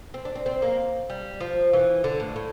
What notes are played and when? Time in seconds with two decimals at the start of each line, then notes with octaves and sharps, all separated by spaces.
0.14 C4
0.25 D4
0.35 C4
0.46 C4
0.62 A#3
1.10 G3
1.41 F3
1.73 E3
2.04 D3
2.20 A2
2.36 A2